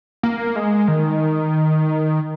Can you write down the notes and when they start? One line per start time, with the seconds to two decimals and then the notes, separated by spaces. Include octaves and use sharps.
0.23 A#3
0.56 G#3
0.88 D#3